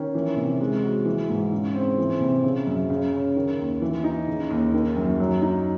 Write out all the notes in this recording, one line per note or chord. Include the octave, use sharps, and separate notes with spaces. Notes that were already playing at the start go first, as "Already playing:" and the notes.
Already playing: D#3 C#4
E3
C3
G#3
F#4
E3
G#2
C#3
C4
E3
C3
C#3
F#2
C#3
C#4
D#3
D#2
E3
D#4
C#3
D#2
D#3
F#2
F#3
D#4